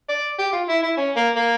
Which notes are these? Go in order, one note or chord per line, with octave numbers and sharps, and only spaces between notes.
D5
G4
F4
E4
E4
C#4
A#3
A#3